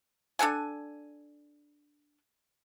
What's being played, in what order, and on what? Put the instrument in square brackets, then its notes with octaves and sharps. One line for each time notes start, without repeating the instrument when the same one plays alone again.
[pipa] D4 A4 F#5 G#5